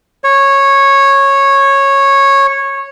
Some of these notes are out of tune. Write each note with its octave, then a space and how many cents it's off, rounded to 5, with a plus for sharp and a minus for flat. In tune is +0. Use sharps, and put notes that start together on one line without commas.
C#5 -10